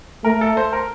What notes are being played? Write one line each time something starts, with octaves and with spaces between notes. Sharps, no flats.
A3 A#4
A4
C5
A#4